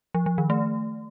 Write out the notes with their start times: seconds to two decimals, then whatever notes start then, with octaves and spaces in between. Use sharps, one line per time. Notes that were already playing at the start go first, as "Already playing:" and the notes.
0.14 F3
0.26 F3
0.38 D#3
0.50 A3